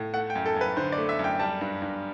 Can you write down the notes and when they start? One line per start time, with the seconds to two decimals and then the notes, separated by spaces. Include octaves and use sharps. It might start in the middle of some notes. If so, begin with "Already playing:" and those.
Already playing: A2
0.14 A3 F#5
0.30 G5
0.35 F#2
0.46 A4
0.56 F#2 B4
0.77 D3 C5
0.92 D5
0.98 A3
1.09 E5
1.19 F#2
1.24 G5
1.39 G3 A5
1.61 G2
1.82 G2